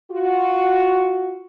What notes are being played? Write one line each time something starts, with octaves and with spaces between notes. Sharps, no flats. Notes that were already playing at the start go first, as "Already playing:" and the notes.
F4 F#4